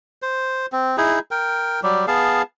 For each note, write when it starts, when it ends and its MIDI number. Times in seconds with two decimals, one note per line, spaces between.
0.22 0.66 72
0.72 0.96 60
0.98 1.19 63
0.98 1.19 64
0.98 1.19 68
1.31 1.80 70
1.31 1.80 79
1.83 2.05 54
1.83 2.05 55
1.83 2.05 67
2.08 2.42 59
2.08 2.42 68
2.08 2.42 77
2.08 2.42 81